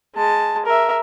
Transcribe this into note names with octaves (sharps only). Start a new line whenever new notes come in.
G#3 A5
A#4 E5